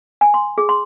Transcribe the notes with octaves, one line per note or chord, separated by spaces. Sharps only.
G#5
C6
G#4
C6